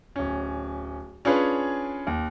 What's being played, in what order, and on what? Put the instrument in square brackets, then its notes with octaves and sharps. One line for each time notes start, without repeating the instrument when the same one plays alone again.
[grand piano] D1 C#4
C#4 D4 F4 G#4 B4 C#5
D#2